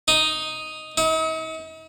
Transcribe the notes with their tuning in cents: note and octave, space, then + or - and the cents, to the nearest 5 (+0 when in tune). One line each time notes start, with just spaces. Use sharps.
D#4 +0
D#4 +45